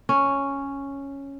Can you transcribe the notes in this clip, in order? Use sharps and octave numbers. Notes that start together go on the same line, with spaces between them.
C#4